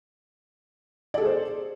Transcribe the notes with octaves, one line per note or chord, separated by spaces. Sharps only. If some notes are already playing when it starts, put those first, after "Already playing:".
G#4 A4 C5 D5